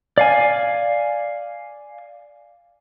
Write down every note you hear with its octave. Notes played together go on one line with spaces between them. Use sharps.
D5 F5 G#5